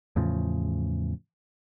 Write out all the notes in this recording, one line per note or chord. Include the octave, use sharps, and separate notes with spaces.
E2 A2 C#3 F3